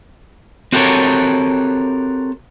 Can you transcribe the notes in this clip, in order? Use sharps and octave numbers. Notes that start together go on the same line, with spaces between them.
C4 F#4 G4 A4 A#4 C#5